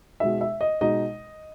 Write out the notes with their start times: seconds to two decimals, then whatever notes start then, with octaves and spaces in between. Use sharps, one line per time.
0.20 B2 G#3 D#4 E5
0.41 E5
0.61 D#5
0.81 B2 G#3 D#4 D#5